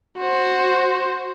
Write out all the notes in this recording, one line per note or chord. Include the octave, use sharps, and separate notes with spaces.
F#4 C5